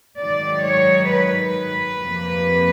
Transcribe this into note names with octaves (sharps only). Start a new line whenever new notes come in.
G#2 D#3 F#3 D5
C#5
B4
F2 C3 F3 A#3